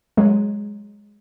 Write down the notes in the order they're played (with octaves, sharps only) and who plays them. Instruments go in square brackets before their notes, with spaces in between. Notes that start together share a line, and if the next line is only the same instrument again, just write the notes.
[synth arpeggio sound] F#3 G#3